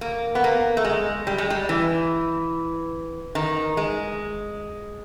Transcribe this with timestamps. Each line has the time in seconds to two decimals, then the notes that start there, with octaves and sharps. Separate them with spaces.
0.01 A#3
0.35 B3
0.44 A#3
0.77 A3
0.84 G#3
1.27 G3
1.38 G#3
1.50 G3
1.69 E3
3.35 D#3
3.77 G#3